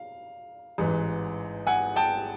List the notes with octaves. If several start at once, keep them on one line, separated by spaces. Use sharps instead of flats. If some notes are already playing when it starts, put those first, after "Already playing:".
Already playing: F5
A1 G#2 E3
F#5 G#5
G5 A5